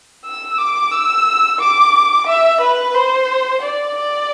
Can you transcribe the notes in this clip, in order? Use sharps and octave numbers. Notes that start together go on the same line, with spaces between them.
E6
D6
E6
D6
E5
B4
C5
D5
D5